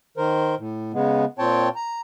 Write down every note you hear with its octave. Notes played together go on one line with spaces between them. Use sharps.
D#3 A#4 C5
A2
C#3 G#3 B3
A#2 C4 C#5 G5 A5
A#5